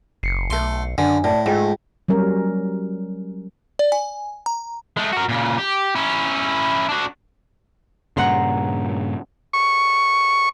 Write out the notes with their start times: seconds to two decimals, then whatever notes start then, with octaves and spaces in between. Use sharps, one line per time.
0.23 F#1 C7 C#7
0.50 B1 A3 C6
0.98 F#2 D3 G#5
1.24 A2 D5 A5
1.46 G#2 A3 F4 G5
2.08 F#3 G3 C#4 A#4
3.79 D5
3.92 G#5
4.46 A#5
4.97 G#3 A3
5.13 F#4 A#4
5.29 A#2 C#3
5.58 G4
5.95 C#4 E4
6.89 D4 F#4
8.17 G2 A#2 C#3 F#5 A#5 C6
9.53 C#6